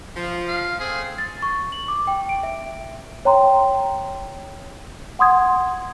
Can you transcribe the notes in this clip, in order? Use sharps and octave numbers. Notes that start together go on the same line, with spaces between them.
F3
F5
A3 C4 G#4
A6
C#6
F#7
D6
G5
D7
E5
C#5 G5 A#5 C6
F#5 C6 D#6 G#6